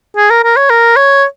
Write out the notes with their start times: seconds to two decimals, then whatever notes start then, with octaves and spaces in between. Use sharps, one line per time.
0.16 G#4
0.30 A#4
0.44 A#4
0.57 C#5
0.70 A#4
0.96 C#5